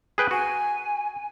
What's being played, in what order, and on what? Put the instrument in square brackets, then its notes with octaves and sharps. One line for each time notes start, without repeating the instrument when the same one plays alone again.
[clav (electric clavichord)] G#4 B4 G5
[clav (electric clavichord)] F#4 [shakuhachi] G#5